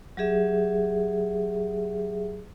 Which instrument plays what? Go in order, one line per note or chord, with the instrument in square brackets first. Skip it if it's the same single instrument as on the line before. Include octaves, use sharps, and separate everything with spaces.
[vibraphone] F#3 G4 G#4 E5